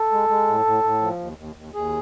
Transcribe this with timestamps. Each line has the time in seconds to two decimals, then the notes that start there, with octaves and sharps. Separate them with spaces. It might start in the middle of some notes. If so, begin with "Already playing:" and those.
Already playing: A4
0.12 G#3
0.29 G#3
0.47 A2
0.65 A2
0.84 A2
1.01 F3
1.19 D#2
1.38 D#2
1.56 D#2
1.74 D#2 G#4